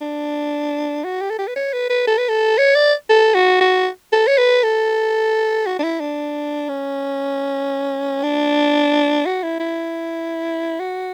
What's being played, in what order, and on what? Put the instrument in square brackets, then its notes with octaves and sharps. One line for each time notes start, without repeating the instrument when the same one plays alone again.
[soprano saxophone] D4
F#4
G4
A4
G4
B4
C#5
B4
B4
A4
B4
A4
C#5
D5
A4
F#4
F#4
A4
C#5
B4
A4
F#4
D4
E4
D4
C#4
D4
F#4
E4
E4
F#4